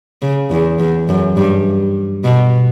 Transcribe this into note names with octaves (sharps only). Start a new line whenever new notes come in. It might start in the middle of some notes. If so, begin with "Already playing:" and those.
C#3
E2
E2
F#2
G2
B2